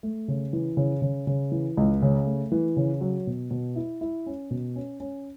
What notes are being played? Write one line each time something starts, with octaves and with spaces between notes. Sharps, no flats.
A3
C#3
E3
C#3
C#3
C#3
E3
C#2
C#3
A3
E3
C#3
F#3
B2
B2
E4
E4
C#4
B2
C#4
C#4